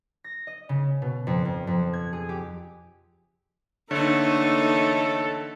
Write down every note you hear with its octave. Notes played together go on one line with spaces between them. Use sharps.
A#6
D#5
C#3
B2
F2
F2
F2
G#6
G#4
G4
D3 E3 A3 A#3 D#4 A4 C#5